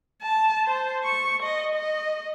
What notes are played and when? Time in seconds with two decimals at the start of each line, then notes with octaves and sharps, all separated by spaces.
0.22 A5
0.66 C5
1.05 C#6
1.43 D#5
1.75 D#5